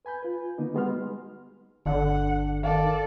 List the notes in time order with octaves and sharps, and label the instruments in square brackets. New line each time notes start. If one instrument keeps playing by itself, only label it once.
[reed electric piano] B4 G#5 B5 G6
F4 B4
D3 A#3 B3 D#4
G3 G#3 B3 F#4 C6 F6
[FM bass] G1 [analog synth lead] D3 [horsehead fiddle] F#5
[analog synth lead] D#3 [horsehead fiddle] A4 D5 [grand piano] F5